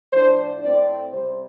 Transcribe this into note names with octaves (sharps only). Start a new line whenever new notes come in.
A2 F3 D4 C5
A2 A3 C4 D5
C3 G3 C4 C5